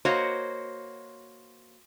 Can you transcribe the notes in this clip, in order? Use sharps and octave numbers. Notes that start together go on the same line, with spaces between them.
A#3 F#4 C5 C#5 D#5